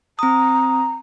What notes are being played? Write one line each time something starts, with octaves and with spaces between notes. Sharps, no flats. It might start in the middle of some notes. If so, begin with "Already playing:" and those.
C4 A#5 D#6